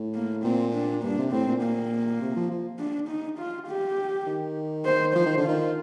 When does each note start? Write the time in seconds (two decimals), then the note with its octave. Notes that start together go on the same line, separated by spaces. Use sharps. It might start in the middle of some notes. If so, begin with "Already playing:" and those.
Already playing: A2
0.15 A#3
0.44 A#2 C4
0.74 D4
1.03 G2 D4
1.18 C3
1.32 A2 C4
1.47 A#2
1.63 A#3
2.21 C3
2.36 F3
2.51 F3
2.79 D4
3.09 D#4
3.39 F4
3.68 G4
4.27 D#3
4.85 C5
5.14 F3 C5
5.26 D#3
5.37 D3
5.44 D#3 F4